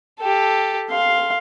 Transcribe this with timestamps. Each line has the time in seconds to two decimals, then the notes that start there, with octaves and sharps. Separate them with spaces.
0.20 G4 A4
0.91 F5 C6